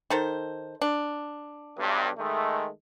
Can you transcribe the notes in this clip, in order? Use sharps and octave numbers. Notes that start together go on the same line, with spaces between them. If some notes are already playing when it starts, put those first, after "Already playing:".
D#3 A4 C5
D4
B1 G2
D#3 G#3 A3